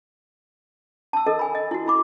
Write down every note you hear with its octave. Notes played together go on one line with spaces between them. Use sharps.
A5 E6
A4 A#4 D#5
G#5 B5
D#5
E4 F#4
E4 B5 D6